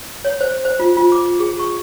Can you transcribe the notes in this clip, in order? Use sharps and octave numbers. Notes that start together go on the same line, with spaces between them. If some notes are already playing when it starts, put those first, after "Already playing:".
C#5
C5
C5
F4
F4
D6
G#4
C#6